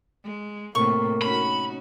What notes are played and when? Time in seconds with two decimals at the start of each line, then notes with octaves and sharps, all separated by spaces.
0.24 G#3
0.75 A2 C3 A#3 A#4 C#6
1.22 C#4 D#4 F#4 B5